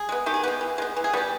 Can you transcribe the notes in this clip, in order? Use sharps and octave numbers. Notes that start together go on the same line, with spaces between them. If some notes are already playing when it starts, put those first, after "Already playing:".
Already playing: G#4
G#3 B3
D#3 G4
G#4
G#3 B3 G4
E3
G#3 B3
E3
G#4
G3 B3 G4